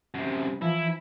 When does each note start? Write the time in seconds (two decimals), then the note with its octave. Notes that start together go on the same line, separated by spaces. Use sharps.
0.14 F#2 C3
0.62 E3 F3 E4